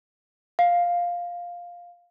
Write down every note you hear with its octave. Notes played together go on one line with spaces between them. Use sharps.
F5